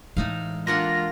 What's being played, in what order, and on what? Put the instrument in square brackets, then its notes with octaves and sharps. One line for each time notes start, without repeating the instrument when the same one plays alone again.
[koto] A2 D#4 F5 [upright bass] E3 G#3
[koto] A#3 D4 F#5 [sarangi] F4 [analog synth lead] A#6